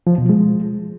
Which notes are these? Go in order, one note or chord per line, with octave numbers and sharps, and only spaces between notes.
F3
B2
G#3